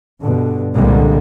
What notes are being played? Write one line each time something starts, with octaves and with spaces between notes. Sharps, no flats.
G2 B2 D3
C2 A#2 D3 G3 G#3 A#3